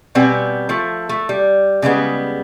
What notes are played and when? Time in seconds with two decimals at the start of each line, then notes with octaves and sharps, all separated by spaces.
0.15 B2 G3 B3 C4 G#5
0.69 F3 A3
1.09 A3
1.29 G3
1.82 C#3 G3 G#3 B3